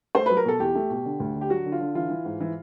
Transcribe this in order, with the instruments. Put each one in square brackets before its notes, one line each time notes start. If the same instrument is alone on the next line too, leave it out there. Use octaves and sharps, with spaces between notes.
[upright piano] A3 C5
F#3 B4
A#4
B2 A4
E2 G4
A3
B2
D3
D2
D3
G4
F#3 F#4
D3
F4
D3
E3 F4
E3
G#2
E3